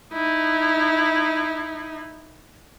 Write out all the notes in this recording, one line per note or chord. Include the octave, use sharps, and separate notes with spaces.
D#4 E4